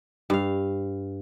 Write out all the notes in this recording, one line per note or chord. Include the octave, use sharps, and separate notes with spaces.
G2 F5